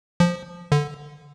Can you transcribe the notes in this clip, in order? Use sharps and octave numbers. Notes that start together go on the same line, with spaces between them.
F3
D3